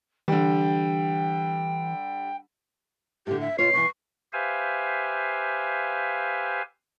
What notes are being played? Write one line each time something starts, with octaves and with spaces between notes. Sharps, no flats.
D3 E3 G3 G5
A2 D3 G4
E5
B2 F4 C#5 C7
B2 E3 C#6
G4 B4 C5 E5 F5 G#5